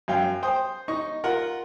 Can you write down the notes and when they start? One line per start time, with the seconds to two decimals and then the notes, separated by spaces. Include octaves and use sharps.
0.08 F#2 F5 G5
0.43 C5 G5 D#6
0.88 D#4 D#5 C#6
1.24 F4 A#4 F#5